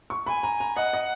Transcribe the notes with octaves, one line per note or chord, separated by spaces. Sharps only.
C#6
G#5 B5
A#5
A#5
D#5 F#5
D#5